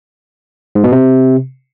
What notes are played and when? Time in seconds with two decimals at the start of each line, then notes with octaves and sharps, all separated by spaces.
0.75 G#2
0.84 B2
0.92 C3